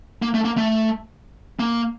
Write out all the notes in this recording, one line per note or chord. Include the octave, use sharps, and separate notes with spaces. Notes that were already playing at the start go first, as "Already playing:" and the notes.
A#3
A3
A#3
A3
A#3